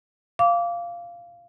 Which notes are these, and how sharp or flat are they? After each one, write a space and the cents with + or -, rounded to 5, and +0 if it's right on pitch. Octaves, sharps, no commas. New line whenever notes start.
F5 -10 D6 -20